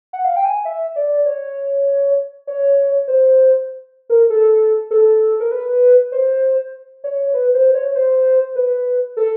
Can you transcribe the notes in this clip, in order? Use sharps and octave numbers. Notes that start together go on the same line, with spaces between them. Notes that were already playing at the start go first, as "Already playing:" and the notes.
F#5
F5
G5
G#5
E5
D5
C#5
C#5
C5
A#4
A4
A4
A#4
B4
C5
C#5
B4
C5
C#5
C5
B4
A4